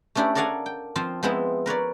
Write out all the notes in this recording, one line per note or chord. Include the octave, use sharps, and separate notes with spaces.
A3 C#4 D4 E4 G4
A4 A#4 D5 F5 F#5 G#5
G5
F3 C4 F4
F3 G#3 B3 C4 E4
A#4 B4 C#5 D5